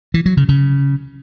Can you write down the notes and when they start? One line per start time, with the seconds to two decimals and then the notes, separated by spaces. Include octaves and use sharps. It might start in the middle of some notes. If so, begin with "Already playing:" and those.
0.14 E3
0.26 F#3
0.37 C#3
0.49 C#3